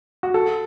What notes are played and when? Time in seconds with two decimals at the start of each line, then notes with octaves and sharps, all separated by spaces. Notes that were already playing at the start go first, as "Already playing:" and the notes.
0.23 F#4
0.34 A4